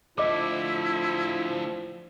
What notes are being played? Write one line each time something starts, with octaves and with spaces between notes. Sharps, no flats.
D2 A2 F3 E4 D#5 D6